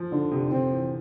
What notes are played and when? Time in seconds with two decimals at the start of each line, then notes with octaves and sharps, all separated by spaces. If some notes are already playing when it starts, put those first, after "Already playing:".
Already playing: F3
0.11 D3 D4
0.31 C3
0.51 D3 C4
0.71 E3